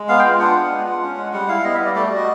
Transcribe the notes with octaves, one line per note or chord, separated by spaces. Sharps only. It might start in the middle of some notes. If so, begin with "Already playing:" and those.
Already playing: G#3
B3 F5
G5
F4
D4 F#5
B3
G#3
F4
C#4
G#3
G3 F#5
E4 F5
B3 D#5
E5
G3
D5
A3 D5
F#4 D5
D#5